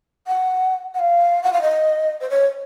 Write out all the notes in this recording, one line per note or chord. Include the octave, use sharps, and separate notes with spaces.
F#5
F#5
F5
F#5
F5
D#5
C5
C#5